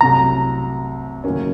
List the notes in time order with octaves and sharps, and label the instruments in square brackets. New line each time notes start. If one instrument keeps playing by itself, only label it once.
[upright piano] C2 C3 F#3 A3 [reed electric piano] A#5
[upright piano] D#2 C#3 F#3 A#3 C#4